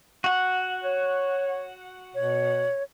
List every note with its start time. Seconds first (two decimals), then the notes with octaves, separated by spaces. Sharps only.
0.24 F#4 F#5
0.84 C#5
2.15 B2 C#5